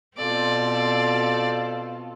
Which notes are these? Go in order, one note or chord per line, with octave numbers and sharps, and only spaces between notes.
B2 C4 F4 A4 D5